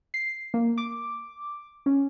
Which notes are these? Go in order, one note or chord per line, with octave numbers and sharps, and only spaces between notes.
C7
A#3
D6
C#4